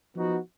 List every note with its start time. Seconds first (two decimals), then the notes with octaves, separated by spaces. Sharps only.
0.16 F3 B3 D#4 F#4